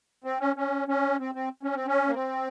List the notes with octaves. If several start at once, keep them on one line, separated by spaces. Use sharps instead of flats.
C4
C#4
C#4
C#4
C4
C4
C#4
C4
C#4
A#3
C4